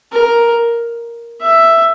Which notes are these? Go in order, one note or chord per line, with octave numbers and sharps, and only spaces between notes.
A#4
E5